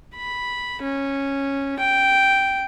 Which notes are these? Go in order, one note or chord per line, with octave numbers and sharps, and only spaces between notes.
B5
C#4
G5